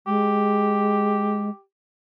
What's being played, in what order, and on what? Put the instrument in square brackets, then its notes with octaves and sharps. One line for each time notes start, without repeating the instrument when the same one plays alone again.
[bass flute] G#3 [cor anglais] G4